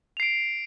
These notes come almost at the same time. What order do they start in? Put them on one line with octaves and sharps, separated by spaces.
F7 C7 D7